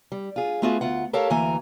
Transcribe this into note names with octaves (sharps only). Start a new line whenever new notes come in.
G3
F4 G#4
A3 B3 F4 F#4 G#4
D2 F4 F#5
G4 A4 A#4 C#5 F5 A5
D2 E3 A#3 G#5 A#5